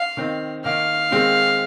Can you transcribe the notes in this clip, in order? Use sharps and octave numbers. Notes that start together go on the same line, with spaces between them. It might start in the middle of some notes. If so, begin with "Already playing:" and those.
Already playing: F5
D#3 C4 D#4
D#3 A#3 D#4 F5
D#3 G#3 C4 D#4